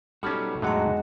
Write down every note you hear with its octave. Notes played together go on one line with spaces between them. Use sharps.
G3 B3 C#4 D#4 F#4 A4
F2 A2 D3 F#3 G#3 F#5 A#5